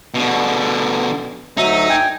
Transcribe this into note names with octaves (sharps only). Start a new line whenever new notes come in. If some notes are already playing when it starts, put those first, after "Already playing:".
B2 D3
D2 F#3 D#4 E5
G5 G#5